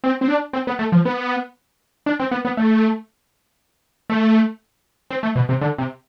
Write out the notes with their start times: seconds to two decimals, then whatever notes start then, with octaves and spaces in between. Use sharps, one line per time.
0.04 C4
0.21 C4
0.28 D4
0.53 C4
0.67 B3
0.79 A3
0.92 F3
1.05 B3
2.06 D4
2.20 C4
2.31 B3
2.45 B3
2.57 A3
4.10 A3
5.10 C4
5.23 A3
5.36 B2
5.49 C3
5.61 D3
5.78 C3